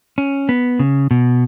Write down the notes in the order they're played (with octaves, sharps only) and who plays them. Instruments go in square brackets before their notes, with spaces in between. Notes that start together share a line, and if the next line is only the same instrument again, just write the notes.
[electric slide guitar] C#4
B3
C#3
B2